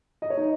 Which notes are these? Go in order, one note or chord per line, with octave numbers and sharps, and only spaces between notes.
D#5
C#5
D#4 D#5